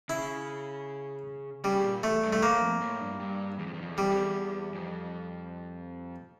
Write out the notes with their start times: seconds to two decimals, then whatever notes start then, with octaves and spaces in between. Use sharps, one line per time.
0.09 C#3 E4
1.64 C#3 G3
1.84 A#2
2.03 E2 A3
2.23 G2
2.33 A3
2.42 A2 A#3
2.62 F2
2.81 A2
3.00 G2
3.19 G2
3.59 E2
3.66 F2
3.74 E2
3.81 F2
3.89 E2
3.97 F2 G3
4.03 E2
4.11 F2
4.19 E2
4.75 F2